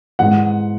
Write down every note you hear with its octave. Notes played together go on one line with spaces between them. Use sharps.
G#2 E3 F#5